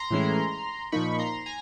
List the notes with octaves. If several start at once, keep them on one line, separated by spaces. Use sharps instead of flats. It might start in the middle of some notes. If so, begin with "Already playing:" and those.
Already playing: A#5 C6
A2 E3 G#3 C#4 E4
A#2 F3 A#3 D#4 B5 C#6
A#5 C6
G#5 A#5